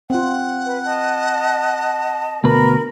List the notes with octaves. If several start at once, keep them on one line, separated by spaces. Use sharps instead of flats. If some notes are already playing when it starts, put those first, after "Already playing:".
C4 F4 F#5
B4
D#5 A5
D2 B2 A#4 B4 B5